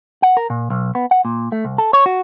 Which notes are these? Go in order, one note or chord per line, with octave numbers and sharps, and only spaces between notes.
F#5
A#4
A#2
B1
B3
F#5
A#2
A3
C2
A4
C#5
F#4